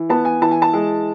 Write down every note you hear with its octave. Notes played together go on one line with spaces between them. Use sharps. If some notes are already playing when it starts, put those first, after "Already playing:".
Already playing: E3
B3 A5
G#5
E3 A5
G#5
A5
G#3